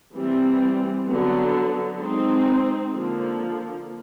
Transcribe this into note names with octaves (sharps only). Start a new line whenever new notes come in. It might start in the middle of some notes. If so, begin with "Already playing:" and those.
E3 G3 C4
D3 F#3 B3
G#3 C4 D#4
D3 F3 A#3